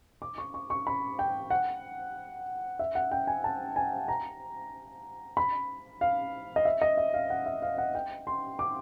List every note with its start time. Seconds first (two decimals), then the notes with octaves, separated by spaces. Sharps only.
0.22 D6
0.38 C#6
0.54 C#6
0.70 C#6
0.87 B5
1.19 G5
1.50 F#5
2.79 E5
2.95 F#5
3.11 G5
3.27 G#5
3.44 A5
3.76 G#5
4.08 A#5
5.37 B5
6.01 F5
6.56 D#5
6.65 E5
6.82 D#5
6.97 E5
7.14 F5
7.30 F#5
7.46 E5
7.62 F5
7.78 F#5
7.95 G5
8.27 C6
8.59 D6